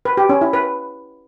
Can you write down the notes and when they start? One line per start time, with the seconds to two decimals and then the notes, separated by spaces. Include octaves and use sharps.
0.05 B4
0.17 G4
0.29 C#4
0.41 E4
0.53 B4